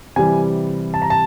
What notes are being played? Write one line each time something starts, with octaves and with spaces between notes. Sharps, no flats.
C3 E3 G3 G#5
A5
A#5
A5